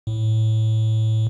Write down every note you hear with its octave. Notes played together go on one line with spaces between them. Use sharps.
A2